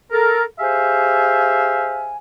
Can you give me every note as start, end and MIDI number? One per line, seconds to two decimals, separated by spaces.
0.12 0.43 69
0.12 0.43 70
0.60 2.17 67
0.60 2.17 68
0.60 2.17 72
0.60 2.17 76
0.60 2.17 77
0.60 2.17 80